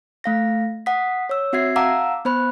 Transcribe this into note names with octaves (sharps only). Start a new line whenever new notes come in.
A3 F5 A#6
F#5 D#6 B6
C#5 E6
C4 F#4 E5 G#6 C7
F5 F#5 A5 A#5 D6 E6
B3 C5 B5 F#6